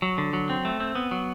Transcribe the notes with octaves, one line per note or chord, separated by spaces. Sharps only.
F#3
D3
F#3
C4
A3
C4
B3
F#3